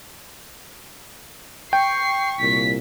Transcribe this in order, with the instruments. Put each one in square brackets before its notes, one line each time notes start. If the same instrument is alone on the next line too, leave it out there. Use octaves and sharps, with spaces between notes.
[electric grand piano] G5 [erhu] C#6 [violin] C7
[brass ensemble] C2 A#2 [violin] B6